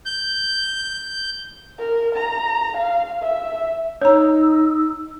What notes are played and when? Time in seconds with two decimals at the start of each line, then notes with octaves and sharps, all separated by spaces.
0.06 G6
1.78 A#4
2.15 A#5
2.76 F5
3.23 E5
4.02 D#4 C#5 A#5 E6